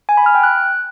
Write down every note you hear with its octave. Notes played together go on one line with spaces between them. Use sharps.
G#5
B5
F6
G5
F#6